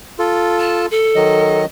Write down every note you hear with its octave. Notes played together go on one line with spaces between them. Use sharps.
F4 A4
A5
A4
D#3 F#3 D#5